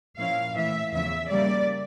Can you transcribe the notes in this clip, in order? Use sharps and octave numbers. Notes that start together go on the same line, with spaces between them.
A#2 F3 C#4 E4 F5
A2 E3 A3 E5
E2 C#3 F3 E5
C#3 G3 A#3 D5